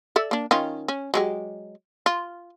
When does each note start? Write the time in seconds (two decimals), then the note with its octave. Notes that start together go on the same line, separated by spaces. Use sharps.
0.16 A4 D5 E5
0.31 A#3 D4
0.51 D#3 C#4 F4
0.88 C#4
1.14 F#3 G#3 G4
2.06 F4